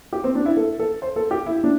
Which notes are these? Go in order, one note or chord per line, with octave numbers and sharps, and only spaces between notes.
G4
C4
D4
E4
A4
A4
C5
A4
G4
E4
D4